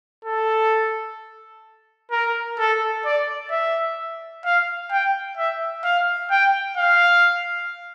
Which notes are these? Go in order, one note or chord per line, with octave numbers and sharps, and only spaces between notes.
A4
A#4
A4
D5
E5
F5
G5
E5
F5
G5
F5